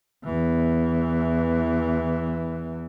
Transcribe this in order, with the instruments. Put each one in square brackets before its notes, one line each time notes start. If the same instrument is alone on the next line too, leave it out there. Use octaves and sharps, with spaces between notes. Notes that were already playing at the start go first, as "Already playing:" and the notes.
[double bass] E2 E3